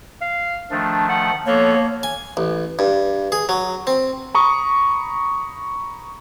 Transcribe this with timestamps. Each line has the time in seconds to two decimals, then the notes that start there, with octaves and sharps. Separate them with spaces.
0.21 F5
0.71 D#3 F3 A3 D4
1.09 F#5
1.46 F3 A#3 B3 A4 C#5
2.03 G#5
2.37 A1
2.79 G2
3.32 G#4
3.49 F#3
3.87 C4
4.35 A#5 B5 C#6 D#6